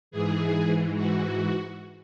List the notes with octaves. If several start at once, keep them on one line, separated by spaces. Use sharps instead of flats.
G#2 E3 G#4
F#4